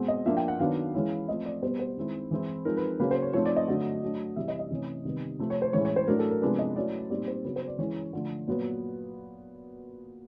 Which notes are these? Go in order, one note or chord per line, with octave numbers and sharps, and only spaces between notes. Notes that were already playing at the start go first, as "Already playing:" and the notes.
Already playing: B2 G#3 C4
D#5
F3 A#3 D4 E5
G5
F#5
D#3 F#3 B3 D4 F5
E3 G#3 C#4 E4
F3 A3 C4 D#5
D5
B2 G3 B3 C5
C5
D#3 G#3 C4 E4
E3 G#3 C4 E4
F3 G#3 C4 D#4 A#4
B4
C#3 F#3 A#3 C#4 B4
C5
C#5
F3 A3 C4 D#4 C#5
D5
D#5
D3 F#3 A3 D4
F#3 A3 D4
C3 E3 G3 E5
D#5
D#5
C3 E3 A3 C#4
C3 D#3 G3 B3
C3 F3 A3 C4
C#5
C5
A2 E3 G#3 C#4 E4 C#5
C#5
C5
A2 F#3 A3 D4 A#4
A4
A#4
C3 F3 G#3 B3 D4 B4
D#5
F#3 A3 C#4 E4 D5
A#2 G3 C4 D#4 D5
C5
C#3 F#3 B3 B4
C5
D5
E3 G#3 C#4 E4 C#5
D3 F3 A3
A#2 F#3 B3